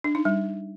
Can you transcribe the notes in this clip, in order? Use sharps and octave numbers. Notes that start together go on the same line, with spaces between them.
D4
D#4
G3